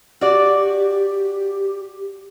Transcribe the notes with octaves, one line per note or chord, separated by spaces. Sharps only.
F#4 G4 D5